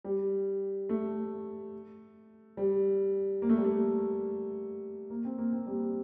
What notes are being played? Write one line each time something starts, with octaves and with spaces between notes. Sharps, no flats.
G3
A3
G3
A#3
A3
G3
A3
A#3
C4
A#3
C4
G3 A#3